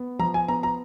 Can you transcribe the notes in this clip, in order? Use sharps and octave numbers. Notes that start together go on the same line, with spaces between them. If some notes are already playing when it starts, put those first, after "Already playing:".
Already playing: B3
F3 A#5
G#5
B3 A#5
A#5